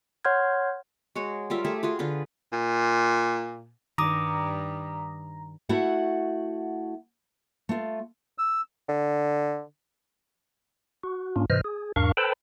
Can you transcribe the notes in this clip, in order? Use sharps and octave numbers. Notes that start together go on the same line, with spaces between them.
C#5 F#5 C6 F6 G6 G#6
G#3 F#4 C#5
G3 F4 A#4 E5
A3 G4 G#4 E5
F4 F#4 G#4
D3 F4 B4
A#2
G2 D#3 G3 A#5 D6 D#6
A3 E4 F#4 F#5
A3 F4
E6
D3
F#4
G#2 A#3 C#4 D4 F4
G#2 C3 E3 C5 D#5 F6
G#4
E2 G#2 D4 A#4 F5 C#6
A4 B4 C5 G5 A5 B5